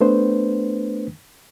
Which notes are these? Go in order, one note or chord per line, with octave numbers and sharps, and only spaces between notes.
A3 B3 D4 B4 C5